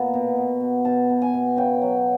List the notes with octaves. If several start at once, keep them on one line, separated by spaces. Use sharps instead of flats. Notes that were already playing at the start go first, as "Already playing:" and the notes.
Already playing: A#2 B3 A5
B2
B2
B2
B2 A5
B2
G#5
B2
C#3 G5
F#3